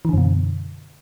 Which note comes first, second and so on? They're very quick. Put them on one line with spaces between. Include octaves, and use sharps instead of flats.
E3 D3 F#2 B2